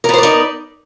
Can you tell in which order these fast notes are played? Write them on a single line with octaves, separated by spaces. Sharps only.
A#4 B3 C5 D5 D#4